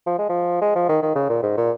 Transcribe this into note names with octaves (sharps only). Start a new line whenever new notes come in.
F3
G#3
F3
G#3
F3
D#3
D#3
C#3
A#2
G#2
A#2